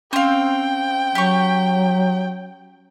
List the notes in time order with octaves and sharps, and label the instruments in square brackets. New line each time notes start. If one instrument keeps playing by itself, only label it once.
[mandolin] C4 F5 [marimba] C#4 [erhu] G5
[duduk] F#3 [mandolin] G4 C#6